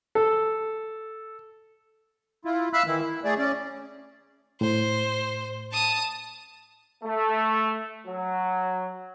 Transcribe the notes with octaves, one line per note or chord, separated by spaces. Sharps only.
A4
E4 F4
E5 F5 B5 E6 F#6
D#3 E3 E4
E4
A3 G#4 D5
C#4 D5
A2 C5
A5 D#6
A3
F#3